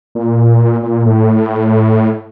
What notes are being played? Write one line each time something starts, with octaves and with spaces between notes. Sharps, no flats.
A#2
A#2
A2